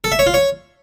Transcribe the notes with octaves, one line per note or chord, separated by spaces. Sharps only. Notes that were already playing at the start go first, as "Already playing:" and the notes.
A4
E5
C#5
F4
C#5